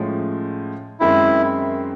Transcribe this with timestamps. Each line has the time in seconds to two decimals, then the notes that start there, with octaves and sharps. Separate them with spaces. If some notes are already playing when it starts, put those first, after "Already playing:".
Already playing: A2 F3 G#3 C#4
1.00 F#2 D#3 G#3 C4 E4